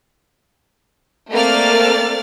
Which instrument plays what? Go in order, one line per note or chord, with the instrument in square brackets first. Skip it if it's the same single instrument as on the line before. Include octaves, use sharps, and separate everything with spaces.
[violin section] A3 A#3 C4 D5 F6 A6